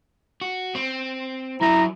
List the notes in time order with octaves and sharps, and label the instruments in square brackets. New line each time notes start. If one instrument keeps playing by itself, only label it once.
[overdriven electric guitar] F#4
C4
[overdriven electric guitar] F#3 E5 [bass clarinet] E4 [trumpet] A#5